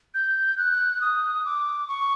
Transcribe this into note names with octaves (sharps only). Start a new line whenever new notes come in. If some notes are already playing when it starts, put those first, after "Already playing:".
G6
F#6
D#6
D6
C#6